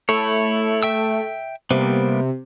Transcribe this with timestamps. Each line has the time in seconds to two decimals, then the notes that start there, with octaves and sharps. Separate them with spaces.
0.09 A3 E4 C#5
0.83 E5 G5 E6
1.70 C3 G3 A#3 B3